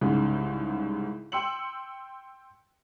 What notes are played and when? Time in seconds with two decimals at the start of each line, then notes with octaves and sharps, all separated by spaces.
0.01 C2 G#2 C#3
1.32 G5 C6 E6 C#7 F#7